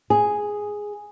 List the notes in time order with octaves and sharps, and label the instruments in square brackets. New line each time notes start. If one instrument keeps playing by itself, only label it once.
[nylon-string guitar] G#4